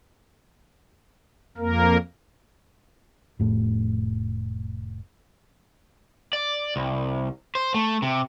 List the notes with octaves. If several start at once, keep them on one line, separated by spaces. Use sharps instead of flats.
F2 A#3 A#4
F1 A2
D5
C2
C5
A3
C3